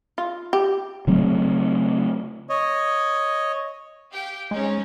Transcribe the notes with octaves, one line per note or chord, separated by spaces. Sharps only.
F4
G4
C#3 F#3 A3 C4
C#5 D#5
G4 F5 G5
G#3 C4 C#4 D#4